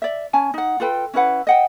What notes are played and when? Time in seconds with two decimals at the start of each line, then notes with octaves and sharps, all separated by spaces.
0.02 D5 E5
0.33 C#4 G#5 A5
0.54 D#4 F#5
0.80 F4 A4 B4 G5
1.14 C#4 E4 B4 F#5
1.47 D#5 F#5 G5